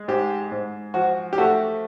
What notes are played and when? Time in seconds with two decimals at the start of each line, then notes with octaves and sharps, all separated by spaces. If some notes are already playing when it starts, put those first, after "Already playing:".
Already playing: G#3
0.08 G#2 G4
0.52 G#2
0.94 F3 F#4
1.33 G4
1.38 A3 F#4